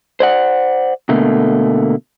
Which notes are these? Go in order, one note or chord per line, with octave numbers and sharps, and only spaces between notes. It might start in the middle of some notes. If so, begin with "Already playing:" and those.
C5 D5 F#5
B2 D3 A3 A#3